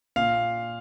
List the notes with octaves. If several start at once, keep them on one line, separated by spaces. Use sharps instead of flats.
A#2 F5